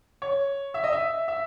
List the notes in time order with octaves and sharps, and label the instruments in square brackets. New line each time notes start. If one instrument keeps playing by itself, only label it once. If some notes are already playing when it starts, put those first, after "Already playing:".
[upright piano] C#5
E5
D#5
E5
E5